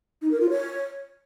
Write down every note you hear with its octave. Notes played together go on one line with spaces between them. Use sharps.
D#4
A#4
F4
C#5